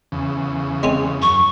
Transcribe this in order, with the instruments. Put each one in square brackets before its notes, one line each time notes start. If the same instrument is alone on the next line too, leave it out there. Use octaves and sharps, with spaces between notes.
[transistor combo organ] E2 C#3
[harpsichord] G#3 C4 C#4
[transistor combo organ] F#2 [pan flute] C#6